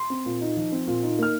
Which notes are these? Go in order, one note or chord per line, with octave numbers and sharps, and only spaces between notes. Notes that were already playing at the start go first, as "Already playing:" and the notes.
Already playing: C6
C4
A#2
D#4
F3
C4
A#2
D#4
A#3 F6